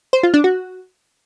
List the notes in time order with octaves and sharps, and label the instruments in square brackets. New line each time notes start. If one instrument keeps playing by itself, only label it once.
[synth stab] C5
F4
D4
F#4